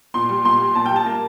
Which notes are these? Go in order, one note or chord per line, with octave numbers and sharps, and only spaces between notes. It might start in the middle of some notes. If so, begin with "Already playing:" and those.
A#2 C6
G3
A#2 C6
G3
A#2 A5
G5
G3 A5
A#3